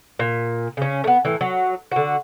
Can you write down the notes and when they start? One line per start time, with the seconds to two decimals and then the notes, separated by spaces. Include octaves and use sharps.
0.19 A#2
0.77 C#3 C#4
1.04 A3 B3
1.25 A2 E3
1.41 F#3
1.92 D3 F#4